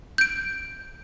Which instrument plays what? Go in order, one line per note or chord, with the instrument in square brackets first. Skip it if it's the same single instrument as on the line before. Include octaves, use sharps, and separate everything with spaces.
[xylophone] G6 D7